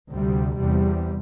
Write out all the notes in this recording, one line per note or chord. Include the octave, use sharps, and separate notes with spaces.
D2 C3 G3
E2 C3 G3